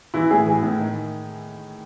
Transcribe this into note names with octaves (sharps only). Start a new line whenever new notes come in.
E3 E4
A2 G#4
E3 G#4
A2
D#3